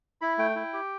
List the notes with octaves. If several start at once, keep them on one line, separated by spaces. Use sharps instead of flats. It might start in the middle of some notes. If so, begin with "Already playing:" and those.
E4 B5
A3 G5
E4
G4